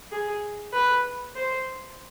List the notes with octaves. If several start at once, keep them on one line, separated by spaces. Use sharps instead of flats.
G#4
B4
C5